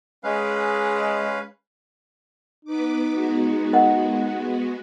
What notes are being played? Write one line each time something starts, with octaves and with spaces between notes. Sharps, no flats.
G#3 C#4 B4 F5
B3 D#4 B4 D6
G#3 B3 F#4
A#4 D#5 F#5